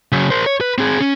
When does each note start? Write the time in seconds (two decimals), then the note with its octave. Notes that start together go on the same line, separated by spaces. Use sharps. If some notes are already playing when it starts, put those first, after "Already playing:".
0.12 C#3 F#3
0.30 A#4 C5
0.46 C#5
0.61 B4
0.78 C4 G#4
1.00 C#4